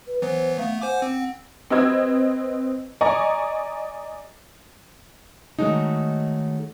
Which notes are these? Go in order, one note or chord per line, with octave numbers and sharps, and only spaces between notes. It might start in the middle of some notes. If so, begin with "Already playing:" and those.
B4
E3 F#3 B3 C5
A3 B3 F5
C5 F#5 G#5 D6
C4
C4 B4 D#5 E6 G#6
D5 D#5 G#5 A#5 C#6
D#3 E3 F#3 G#3 A3 D#4